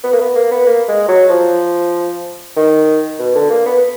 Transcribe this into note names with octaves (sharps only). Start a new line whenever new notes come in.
B3
A#3
B3
A#3
B3
A#3
G#3
F#3
F3
D#3
B2
D3
A#3
B3